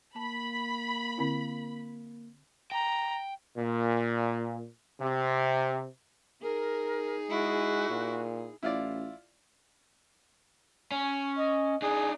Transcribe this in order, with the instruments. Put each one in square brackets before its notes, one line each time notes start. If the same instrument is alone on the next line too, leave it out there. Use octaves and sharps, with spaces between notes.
[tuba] A#3 [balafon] A5 [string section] B5
[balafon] D3 C4 E4
[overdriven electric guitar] G5 [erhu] A#5
[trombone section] A#2
C3
[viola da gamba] D#4 G#4 [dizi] A#4
[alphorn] G#3 [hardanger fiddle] E4 [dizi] F#4
[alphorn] A#2
[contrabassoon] A1 [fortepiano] E4 F4 D5
[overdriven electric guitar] C#4
[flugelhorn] D#5
[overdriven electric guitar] D4 D#4 [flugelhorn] G#4